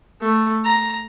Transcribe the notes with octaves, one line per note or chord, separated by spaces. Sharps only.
A3
A#5